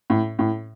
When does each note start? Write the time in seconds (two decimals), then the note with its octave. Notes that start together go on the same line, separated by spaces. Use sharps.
0.10 A2
0.39 A2